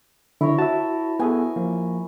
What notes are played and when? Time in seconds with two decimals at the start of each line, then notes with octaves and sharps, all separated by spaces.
0.41 D3 E4 A#4 C#5
0.59 F#4 E5 A5
1.20 B3 G#4 A4 G#5
1.56 F3 A#3